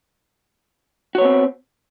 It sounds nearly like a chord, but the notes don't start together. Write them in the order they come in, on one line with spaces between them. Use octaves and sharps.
F#4 C#5 B3 C4